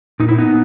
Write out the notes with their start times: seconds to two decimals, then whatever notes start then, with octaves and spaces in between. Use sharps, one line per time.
0.20 A#2 D#4
0.29 E4
0.38 B3 D#4